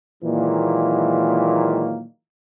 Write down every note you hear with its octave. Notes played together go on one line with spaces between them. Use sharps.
A#2 D#3 E3 F#3 G#3 A#3